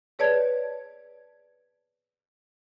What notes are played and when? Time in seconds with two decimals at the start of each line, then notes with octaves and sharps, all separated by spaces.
0.19 G#4 B4 C#5 D5 A5 G#6